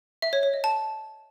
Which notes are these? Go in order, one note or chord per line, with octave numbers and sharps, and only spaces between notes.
E5
C#5
C#5
D#5
A5